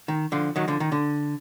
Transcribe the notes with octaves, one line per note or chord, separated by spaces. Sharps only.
D#3
D3 F3
D#3 F#3
D3 F3
D#3
D3